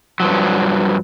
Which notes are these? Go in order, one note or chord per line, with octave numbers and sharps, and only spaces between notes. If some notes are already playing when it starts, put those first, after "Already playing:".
G2 F3 F#3